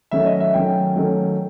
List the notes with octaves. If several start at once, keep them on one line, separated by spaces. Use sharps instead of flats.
D#3 F#3 A3 C#4 E5
D#5
E5
D#3 F#3 A3 C#4 G5
D#3 F#3 A3 C#4